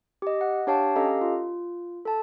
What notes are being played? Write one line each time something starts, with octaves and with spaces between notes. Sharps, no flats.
G4 D#5
F#5
D4 G4 C#5 F5 G5 A5
C#4 G4 A4 D#5 F5 A#5
F4
A4 A5